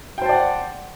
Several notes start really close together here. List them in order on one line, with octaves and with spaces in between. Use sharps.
G5 C5 A5 D5 F#5